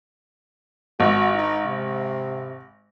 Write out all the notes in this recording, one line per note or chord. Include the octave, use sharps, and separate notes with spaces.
G#1 F#4
D#4
C3